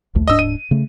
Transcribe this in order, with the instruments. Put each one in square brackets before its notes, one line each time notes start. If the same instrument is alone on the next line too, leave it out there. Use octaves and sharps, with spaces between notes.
[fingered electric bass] A#1 D#2 A3
[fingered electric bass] D1 G#2 D4 [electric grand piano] D#5 E6
[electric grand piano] D#7
[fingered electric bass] C#3 A3